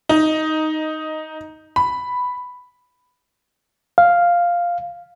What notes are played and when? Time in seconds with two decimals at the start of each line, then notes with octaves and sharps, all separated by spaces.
0.09 D#4
1.76 B5
3.98 F5